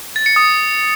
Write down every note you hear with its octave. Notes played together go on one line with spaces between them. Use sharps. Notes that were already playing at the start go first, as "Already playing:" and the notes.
A6
C#7
D#6